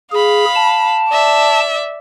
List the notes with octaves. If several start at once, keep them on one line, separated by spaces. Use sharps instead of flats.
G#4 F5 B5
A5
D5 E5